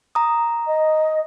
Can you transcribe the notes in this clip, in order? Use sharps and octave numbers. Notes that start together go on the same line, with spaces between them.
A#5 D#6
D#5